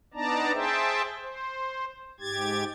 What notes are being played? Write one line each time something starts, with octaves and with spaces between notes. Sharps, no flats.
B3 D4 D#4 D5 A5 A#5
G#4 C5 E5 G5 A5
C5
G#2 G4 G#6 A6